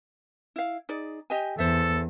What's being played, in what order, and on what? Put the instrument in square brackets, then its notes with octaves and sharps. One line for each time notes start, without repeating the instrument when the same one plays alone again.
[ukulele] E4 F5
D#4 G#4 D5
G4 D#5 G#5
[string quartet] E2 [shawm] A4 [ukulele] C5 E5